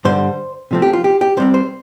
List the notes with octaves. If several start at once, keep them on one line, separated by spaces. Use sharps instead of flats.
G2 D3 G3 C5
C3 F3 A3 C4
G4
F4
G4
G4
C2 C3 G3 C4 C5
C5